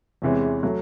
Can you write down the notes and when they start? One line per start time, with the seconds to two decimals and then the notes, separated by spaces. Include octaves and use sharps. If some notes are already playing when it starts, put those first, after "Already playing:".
0.22 E2 C3 E3 G#3 C#4
0.63 F#3 A3